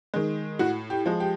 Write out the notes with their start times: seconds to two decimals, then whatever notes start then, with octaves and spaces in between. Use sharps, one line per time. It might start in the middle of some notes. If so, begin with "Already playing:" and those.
0.14 D#3 G#3
0.59 A2 F#4
0.90 G4
1.06 F3 G#3
1.20 G4